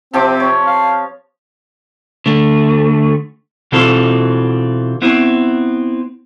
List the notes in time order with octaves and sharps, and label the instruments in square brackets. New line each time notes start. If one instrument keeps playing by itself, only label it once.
[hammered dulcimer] C3 F3 D6 [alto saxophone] C4
[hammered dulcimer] C#5
[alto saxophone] F5
[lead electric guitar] D3 A3
[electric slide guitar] B2 E3 C4 F4 A4
B3 C4 E4